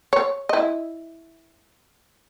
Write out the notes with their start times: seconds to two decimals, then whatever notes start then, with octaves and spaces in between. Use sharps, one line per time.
0.13 C#5
0.49 E4 D#5